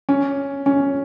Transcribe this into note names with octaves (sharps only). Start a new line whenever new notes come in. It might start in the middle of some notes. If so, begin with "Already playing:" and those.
C#4
C#4